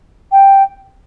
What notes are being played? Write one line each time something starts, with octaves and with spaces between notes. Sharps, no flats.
G5